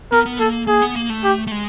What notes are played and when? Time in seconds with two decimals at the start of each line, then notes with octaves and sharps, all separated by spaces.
0.12 B3 A#4
0.26 B3
0.39 A#3 A4
0.67 A#3 G#4
0.82 B3
0.96 A#3
1.10 A3
1.24 G4
1.47 A3
1.51 G#3